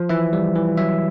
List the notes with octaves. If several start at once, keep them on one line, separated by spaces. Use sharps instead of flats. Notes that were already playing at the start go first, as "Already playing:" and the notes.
Already playing: F3
E3 E5
G3
E3
F#3 E5